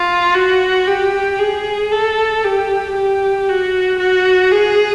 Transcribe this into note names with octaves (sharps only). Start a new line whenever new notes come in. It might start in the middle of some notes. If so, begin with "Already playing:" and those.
Already playing: F4
F#4
G4
G#4
A4
G4
G4
F#4
F#4
G#4